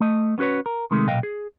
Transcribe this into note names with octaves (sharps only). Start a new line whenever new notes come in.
A3 D#5
B3 C#4 F#4 B4 C#5
A#4
C3 D#3 G#3 A3
B1 A#2 D#5 F5 G5
G#4